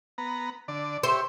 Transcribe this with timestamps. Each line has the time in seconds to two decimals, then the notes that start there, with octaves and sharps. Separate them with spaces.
0.18 B3 A#5
0.68 D3 D5
1.03 G4 C5 C#5 E5